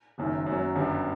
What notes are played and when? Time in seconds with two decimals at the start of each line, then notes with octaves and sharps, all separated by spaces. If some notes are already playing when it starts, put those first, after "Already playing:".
0.18 F#1 F#2 D#3
0.46 F#2
0.52 F#3
0.75 G1 F#2 D3 G3